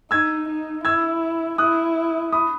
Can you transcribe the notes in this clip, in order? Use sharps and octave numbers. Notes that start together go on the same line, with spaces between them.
D#4 E6 G#6
D#4
E4 E6 G#6
E4 D#6 F#6
B5 D#6